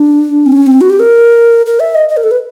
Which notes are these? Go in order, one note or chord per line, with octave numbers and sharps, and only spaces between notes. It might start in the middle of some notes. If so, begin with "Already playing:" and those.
Already playing: D4
C4
C#4
C4
F#4
G4
A#4
A#4
E5
D#5
D#5
A#4
A4
B4